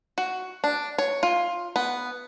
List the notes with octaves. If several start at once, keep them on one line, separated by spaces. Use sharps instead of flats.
F#4
D4
C#5
F4
B3